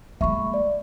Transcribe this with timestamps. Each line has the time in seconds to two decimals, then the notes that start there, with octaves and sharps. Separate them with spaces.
0.21 G#3 A#3 E5 B5 C#6
0.54 D5